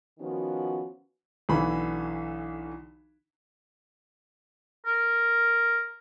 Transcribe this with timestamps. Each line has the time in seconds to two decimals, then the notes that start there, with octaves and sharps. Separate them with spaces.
0.20 D#3 F3 B3 C#4 F#4
1.49 B1 D3 E3 B5
4.86 A#4